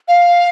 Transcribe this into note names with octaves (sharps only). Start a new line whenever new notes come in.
F5